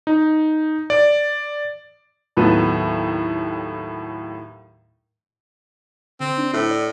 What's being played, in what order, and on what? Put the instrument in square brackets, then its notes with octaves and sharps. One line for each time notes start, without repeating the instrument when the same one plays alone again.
[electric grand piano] D#4
D5
[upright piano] D#2 A2 F#3 B3 A4 D#7
[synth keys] D3 [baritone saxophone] C4
[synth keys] D4
[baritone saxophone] A2 [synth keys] E4 C5
[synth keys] D5